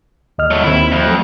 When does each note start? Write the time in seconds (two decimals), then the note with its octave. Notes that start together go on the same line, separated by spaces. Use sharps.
0.38 D#2 D#5 F6
0.51 F#3 A3
0.64 D#2 D#3 C4 E4
0.92 F2
1.03 F3 F#3 A3